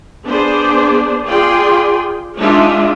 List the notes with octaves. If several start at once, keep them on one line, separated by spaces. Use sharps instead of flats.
B3 D4 G#4 C5 D5
F4 G#4 D5 G5 C6
G#3 D4 D#4 F4 E5